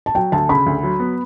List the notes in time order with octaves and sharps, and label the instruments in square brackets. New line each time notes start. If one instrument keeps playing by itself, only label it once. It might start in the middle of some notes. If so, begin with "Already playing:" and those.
[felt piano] A5
[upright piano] F#3 [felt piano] G5
[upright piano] D2 [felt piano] A5
[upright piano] C#3 [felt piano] B5
[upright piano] D2
F#3
B3